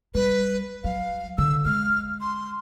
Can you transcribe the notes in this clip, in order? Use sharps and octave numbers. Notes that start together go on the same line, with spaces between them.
G3 B4
F#3 F5
D3 E6
G#3 F6
C6